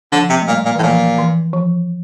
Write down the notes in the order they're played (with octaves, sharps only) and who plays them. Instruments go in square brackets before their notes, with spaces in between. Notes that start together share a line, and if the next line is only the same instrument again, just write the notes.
[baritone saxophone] D3 [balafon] F3
[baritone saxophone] C3
[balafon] A3
[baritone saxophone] A#2 [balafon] G3
[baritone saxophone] A#2
[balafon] E3
[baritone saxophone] A2
[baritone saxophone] A#2 [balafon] F3
[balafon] E3
F3